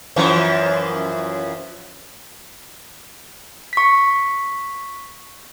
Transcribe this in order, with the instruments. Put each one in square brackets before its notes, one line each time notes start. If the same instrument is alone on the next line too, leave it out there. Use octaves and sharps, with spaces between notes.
[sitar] F#2 E3 F3
[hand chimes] C#6 B6